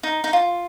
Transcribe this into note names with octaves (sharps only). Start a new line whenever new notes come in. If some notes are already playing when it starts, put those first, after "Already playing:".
D#4
D#4
F4